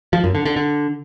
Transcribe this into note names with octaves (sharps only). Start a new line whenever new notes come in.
F3
F#2
D3
D3
D3